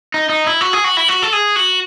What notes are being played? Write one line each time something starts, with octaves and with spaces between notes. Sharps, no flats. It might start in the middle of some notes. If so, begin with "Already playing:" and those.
D#4
D#4
E4
F#4
G#4
F#4
E4
F#4
A4
G#4
F#4